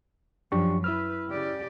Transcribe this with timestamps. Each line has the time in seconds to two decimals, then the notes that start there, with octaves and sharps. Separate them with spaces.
0.52 F#2 F3 D4 G4 C#6
0.84 E4 B4 E6 F6
1.28 C#3 G4 D5